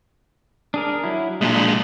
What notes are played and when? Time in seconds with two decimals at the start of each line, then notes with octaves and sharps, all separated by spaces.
0.74 D4 G#4 A#4
1.04 F#3 E4
1.41 B1 A#2 G#3 D4